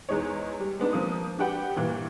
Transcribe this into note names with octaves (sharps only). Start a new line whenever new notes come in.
E2 G#3 D#4 C#5
G3
G#3 B3 D4 D#4
F3 A#3 C4 D#6
D4 F#4 G4 B4 F#5 G5
G2 A#2 E3